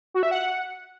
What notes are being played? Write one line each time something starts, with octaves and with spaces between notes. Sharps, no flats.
F#4
E5
F#5